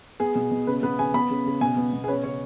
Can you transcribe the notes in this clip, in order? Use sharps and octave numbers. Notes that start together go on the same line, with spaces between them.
B3 G#4
B2
B2
C#3 B4
B3 B4
C#3 G#5
B3 B5
C#3
C#3
B2 G#5
B3
B2
G#4
C#4 B4
C#3 C#5